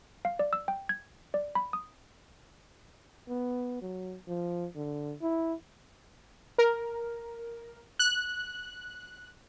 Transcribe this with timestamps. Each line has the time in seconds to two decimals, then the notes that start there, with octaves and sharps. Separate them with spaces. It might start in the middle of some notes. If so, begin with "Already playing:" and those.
0.25 F5
0.39 D5
0.53 E6
0.68 G5
0.89 G#6
1.34 D5
1.55 B5
1.73 D#6
3.28 B3
3.82 F#3
4.28 F3
4.76 D3
5.22 E4
6.58 A#4
7.99 F#6